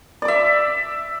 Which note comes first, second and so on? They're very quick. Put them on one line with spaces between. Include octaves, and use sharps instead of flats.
D5 D6 E5